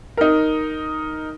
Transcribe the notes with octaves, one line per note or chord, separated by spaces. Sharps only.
D#4 A#4